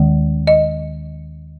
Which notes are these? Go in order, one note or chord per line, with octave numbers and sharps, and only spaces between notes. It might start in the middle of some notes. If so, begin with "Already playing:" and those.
Already playing: D#2 D#3 G#3
D#5